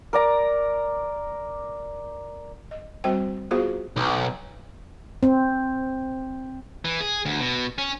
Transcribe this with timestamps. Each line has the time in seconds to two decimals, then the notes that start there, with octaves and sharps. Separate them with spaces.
0.13 A#4 D5 A#5
2.71 D#5
3.04 G3 C4 F#4 C5 G5
3.51 B3 F4 F#4 G#4 C5 F5
3.97 B1
5.23 C4
6.85 E3
7.01 G#4
7.25 D2
7.40 B2
7.78 C#4